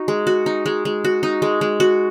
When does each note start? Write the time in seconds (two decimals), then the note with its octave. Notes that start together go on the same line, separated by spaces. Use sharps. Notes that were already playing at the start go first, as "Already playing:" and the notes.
Already playing: D#4 F#4
0.08 G#3
0.27 F#4
0.46 D#4
0.66 G#3
0.85 G#3
1.04 F#4
1.23 D#4
1.42 G#3
1.61 G#3
1.80 F#4